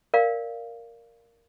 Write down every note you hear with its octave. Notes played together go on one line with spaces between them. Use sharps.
A#4 D5 F5